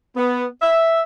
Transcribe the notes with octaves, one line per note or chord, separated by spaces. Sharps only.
B3
E5